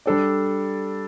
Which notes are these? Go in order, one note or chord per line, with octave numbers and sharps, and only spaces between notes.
G3 D4 A4 D5